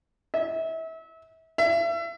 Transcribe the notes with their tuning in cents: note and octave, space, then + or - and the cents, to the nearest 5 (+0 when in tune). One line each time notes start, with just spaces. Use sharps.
E5 -30
E5 +35